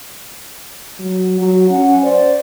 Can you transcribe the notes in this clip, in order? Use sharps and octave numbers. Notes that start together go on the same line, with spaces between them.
F#3
F#3
C#4 F#5
C5 D5